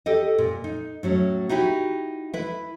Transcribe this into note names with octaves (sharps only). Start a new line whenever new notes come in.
G4 A4 D#5
A#2
D#4
A2 F#3 C#4
D#4 E4 F#4 G4
E4 B4